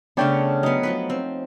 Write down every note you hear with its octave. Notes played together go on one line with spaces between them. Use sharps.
C#3 A3 B3 D4 C#5 G5
F#3 B3 D#4
F3 F#3 B4
C4